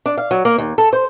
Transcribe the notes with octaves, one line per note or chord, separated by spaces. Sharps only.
D4
F5
F#3
A#3
D#2
A4
C5